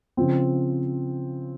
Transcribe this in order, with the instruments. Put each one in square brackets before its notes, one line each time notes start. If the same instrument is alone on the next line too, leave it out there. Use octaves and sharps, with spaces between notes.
[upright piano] C#3 F3 C4